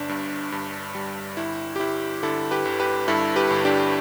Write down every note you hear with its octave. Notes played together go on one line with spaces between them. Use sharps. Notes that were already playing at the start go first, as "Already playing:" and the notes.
Already playing: G1 D4
G2
G2
G3
G1 E4
G4
G1 E4
D3 E4 A4
G4 B4
G1
G4 B4
G2 E4 A4
G4 B4
G1
D4 G4